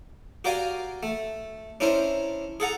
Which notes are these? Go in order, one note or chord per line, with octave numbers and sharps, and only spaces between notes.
F#4 G4 A#4 D5 F5 G#5
A3
C#4 D4 E4 A#4 C5
G#4 A4 F#5 A#5